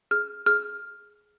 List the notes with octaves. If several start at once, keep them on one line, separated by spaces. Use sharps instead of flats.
G#4 F6
G#4 F6